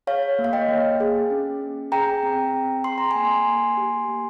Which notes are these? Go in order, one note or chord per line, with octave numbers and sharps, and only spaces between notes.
G#4 C#5 F5
A#3
F5
D#5 G5
A#3
G#4
C#4
C#4
G#4 G5 A#5
C4
C4
G#4 C6
A#5
A#3 G#5 C6
A#3
G4
A#3